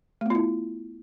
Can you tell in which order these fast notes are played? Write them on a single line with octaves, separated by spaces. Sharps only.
A3 B3 F4 E4